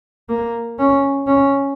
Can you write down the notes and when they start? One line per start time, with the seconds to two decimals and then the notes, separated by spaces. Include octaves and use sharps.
0.29 A#3
0.79 C#4
1.27 C#4